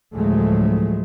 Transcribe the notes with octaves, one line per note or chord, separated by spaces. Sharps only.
D2 A2 F3 F#3 G#3 A3